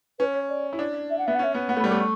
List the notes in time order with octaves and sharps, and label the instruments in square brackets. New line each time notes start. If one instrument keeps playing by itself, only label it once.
[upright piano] C#4 [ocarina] B4
[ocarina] C#5
D5
[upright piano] E4
D4
[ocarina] E5
F#5
[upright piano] B3 [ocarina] E5
[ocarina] F#5
[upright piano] C#4 [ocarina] E5
[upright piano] B3
[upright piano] B3 [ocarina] F#5
[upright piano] A3
[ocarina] B5
[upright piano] G3
[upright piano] A3 [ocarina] D6
[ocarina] C#6